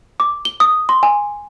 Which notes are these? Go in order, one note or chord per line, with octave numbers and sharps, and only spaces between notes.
D6
G7
D#6
C6
G#5